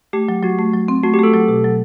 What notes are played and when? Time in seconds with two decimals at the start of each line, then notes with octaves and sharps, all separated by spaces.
0.13 A3 G4
0.29 F#3
0.43 F#3 F#4
0.59 A3
0.73 F#3
0.88 C4
1.03 A3 F#4
1.14 G4
1.19 A3 A4
1.33 F#3
1.48 B2
1.64 F#3